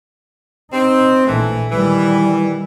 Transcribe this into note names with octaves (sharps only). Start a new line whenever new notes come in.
C4 D#4
A#1 E3 A3
D#3 E3 G3